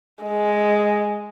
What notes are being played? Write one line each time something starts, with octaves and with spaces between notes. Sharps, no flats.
G#3